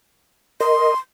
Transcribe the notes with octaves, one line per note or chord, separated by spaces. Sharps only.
A#4 D#5 C6